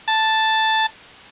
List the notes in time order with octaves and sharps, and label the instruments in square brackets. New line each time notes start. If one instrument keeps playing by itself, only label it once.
[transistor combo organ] A5